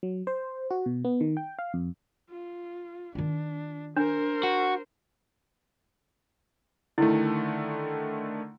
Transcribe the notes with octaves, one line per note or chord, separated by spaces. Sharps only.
F#3
C5
F#4
B2
B3
D#3
G5
F5
F2
F4
D#3 D4 F4
D4 A#4 C5
F#4
D3 D#3 A3 E4